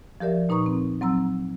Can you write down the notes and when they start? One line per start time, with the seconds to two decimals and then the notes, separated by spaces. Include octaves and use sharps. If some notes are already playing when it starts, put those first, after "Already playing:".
0.20 F3 G4 A#4 D5 E5
0.49 A#2 D#4 B4 A#5 C#6 D#6
0.66 C4
1.01 F#3 C4 A#5 E6